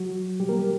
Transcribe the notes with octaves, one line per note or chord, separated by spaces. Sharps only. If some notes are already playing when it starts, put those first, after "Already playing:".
Already playing: F#3 F#4
B2 G3 G4
A#3 A#4
G3 G4